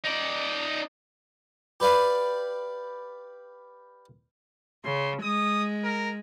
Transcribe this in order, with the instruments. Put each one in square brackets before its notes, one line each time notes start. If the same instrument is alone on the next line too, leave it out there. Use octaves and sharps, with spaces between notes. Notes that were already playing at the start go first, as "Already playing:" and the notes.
[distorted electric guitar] D#4 D5
[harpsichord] G4 B4 D5 F5 B5
[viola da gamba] C#3 [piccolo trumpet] C6
[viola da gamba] G#3 [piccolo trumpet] D#6
[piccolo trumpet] A#4